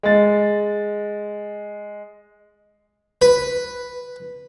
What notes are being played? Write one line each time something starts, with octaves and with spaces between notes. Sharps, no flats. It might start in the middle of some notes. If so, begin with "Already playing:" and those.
G#3 A6
B4